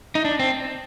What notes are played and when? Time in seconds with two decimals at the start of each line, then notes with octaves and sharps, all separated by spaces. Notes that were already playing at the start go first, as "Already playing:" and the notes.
0.15 D#4
0.25 D4
0.39 C4